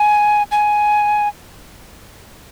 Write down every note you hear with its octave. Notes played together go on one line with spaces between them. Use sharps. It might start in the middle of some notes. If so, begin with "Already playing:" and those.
Already playing: G#5
G#5